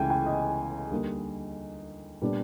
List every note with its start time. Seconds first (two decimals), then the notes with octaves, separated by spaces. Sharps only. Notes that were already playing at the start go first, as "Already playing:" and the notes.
Already playing: C#2 C#3 E3 A3 G5 G#5
0.10 G5
0.26 D#5
0.91 D#2 D3 G3 A#3
2.22 A#2 G3 B3 D4